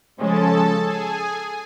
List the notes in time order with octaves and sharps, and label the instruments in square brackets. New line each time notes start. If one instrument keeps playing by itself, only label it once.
[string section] C#3 F3 G#3 C#4 [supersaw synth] A4 A5
[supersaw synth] G#4 G#5